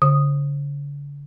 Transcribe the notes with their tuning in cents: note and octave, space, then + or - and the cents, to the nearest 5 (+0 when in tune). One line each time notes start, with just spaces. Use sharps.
D3 -45 D#6 -5